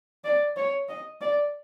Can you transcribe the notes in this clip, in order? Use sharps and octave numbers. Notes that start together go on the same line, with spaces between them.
D5
C#5
D#5
D5